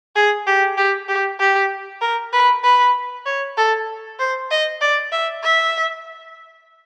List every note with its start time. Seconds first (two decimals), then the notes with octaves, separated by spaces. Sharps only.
0.16 G#4
0.47 G4
0.77 G4
1.08 G4
1.40 G4
2.01 A#4
2.33 B4
2.64 B4
3.26 C#5
3.57 A4
4.19 C5
4.51 D#5
4.81 D5
5.12 E5
5.43 E5